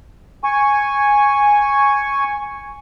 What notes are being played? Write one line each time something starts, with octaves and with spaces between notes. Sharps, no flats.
G#5 C#6